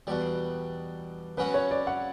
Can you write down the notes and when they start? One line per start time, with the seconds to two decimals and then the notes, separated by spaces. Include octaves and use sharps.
0.07 E2 B2 G3 D5
1.37 C#3 F#3 C#4 F#4 B4
1.54 C#5
1.71 D5
1.87 F#5